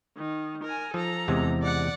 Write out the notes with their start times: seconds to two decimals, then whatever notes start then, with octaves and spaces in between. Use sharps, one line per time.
0.17 D#3
0.64 A#4 G#5
0.94 F3 A4 A#5
1.28 E2 C3 G#3
1.63 D5 F#5